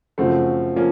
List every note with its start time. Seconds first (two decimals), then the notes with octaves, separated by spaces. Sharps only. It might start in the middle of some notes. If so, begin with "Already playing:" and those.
0.18 F#2 C#3 F3 A3 C4
0.76 F3 A#3 C#4